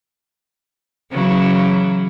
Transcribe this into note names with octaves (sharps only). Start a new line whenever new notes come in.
C#3 E3 F#3